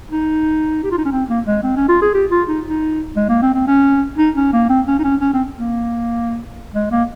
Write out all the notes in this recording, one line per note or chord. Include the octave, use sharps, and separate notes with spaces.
D#4
G4
F4
D#4
C#4
C4
A#3
G#3
C4
C#4
F4
G#4
G4
F4
D#4
D#4
G#3
A#3
C4
C4
C#4
D#4
C#4
A#3
C4
C#4
D#4
C#4
C#4
C4
A#3
G#3
A#3